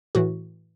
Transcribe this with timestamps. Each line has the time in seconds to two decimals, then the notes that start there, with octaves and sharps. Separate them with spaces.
0.15 A2 E3 F#4